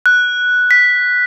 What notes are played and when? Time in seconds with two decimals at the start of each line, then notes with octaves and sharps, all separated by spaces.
0.06 F#6
0.71 B6